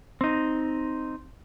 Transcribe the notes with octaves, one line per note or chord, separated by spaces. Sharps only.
C4 D#4